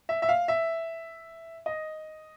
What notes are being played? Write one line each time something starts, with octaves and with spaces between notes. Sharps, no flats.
E5
E5
F5
E5
D#5